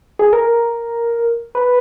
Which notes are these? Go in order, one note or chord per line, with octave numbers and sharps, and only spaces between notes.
G#4
A#4
B4